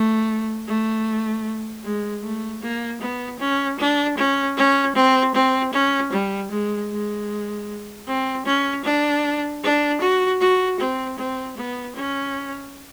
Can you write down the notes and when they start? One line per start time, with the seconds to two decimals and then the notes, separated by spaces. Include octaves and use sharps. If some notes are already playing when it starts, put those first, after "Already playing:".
Already playing: A3
0.68 A3
1.84 G#3
2.24 A3
2.62 A#3
3.01 B3
3.40 C#4
3.79 D4
4.17 C#4
4.57 C#4
4.95 C4
5.35 C4
5.73 C#4
6.12 G3
6.51 G#3
6.91 G#3
8.08 C4
8.46 C#4
8.85 D4
9.63 D4
10.01 F#4
10.41 F#4
10.80 C4
11.18 C4
11.57 B3
11.96 C#4